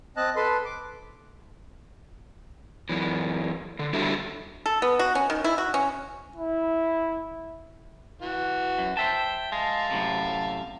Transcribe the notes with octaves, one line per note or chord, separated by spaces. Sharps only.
C4 D#5 A5 F#6
A4 B4 C6
D6
F#2 E3
D3
G3 D4 E4 F#4 A4
A4
B3
F#4
C#4
D#3
E4
F#4
C#4
E4
E3 F#4
F#2
C5 E5 G5 A5
G#3 E5 F5 A5
F#2 A2 C3